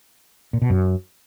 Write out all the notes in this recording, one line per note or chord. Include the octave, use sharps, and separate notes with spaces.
A#2
B2
F#2